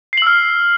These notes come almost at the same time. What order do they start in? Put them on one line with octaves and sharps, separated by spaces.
C7 F#7 E6 F6